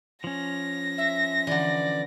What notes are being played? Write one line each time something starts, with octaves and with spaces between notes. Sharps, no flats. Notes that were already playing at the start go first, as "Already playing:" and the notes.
F3 C#4 A#6
E5
D3 E3 D5